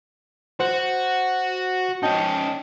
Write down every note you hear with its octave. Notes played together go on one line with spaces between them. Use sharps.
F#4 C5 F#5 F#6
C#4 D#4 D#5 G5 A5